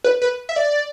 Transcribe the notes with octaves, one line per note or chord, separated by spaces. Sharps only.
B4
B4
E5
D5